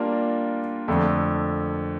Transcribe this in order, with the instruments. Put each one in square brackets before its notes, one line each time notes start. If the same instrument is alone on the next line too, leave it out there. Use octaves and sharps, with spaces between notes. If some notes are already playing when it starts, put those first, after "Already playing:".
Already playing: [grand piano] G3 A#3 D4 F4 A#4
F2 D3 A3